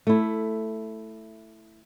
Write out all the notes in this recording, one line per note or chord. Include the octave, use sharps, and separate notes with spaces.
A3 E4